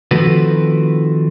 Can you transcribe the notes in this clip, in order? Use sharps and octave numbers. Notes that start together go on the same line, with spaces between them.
D#3 F3 A3 C4 F#4 B4